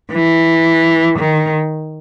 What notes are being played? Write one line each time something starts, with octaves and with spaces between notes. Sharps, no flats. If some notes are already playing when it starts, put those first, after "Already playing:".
E3
D#3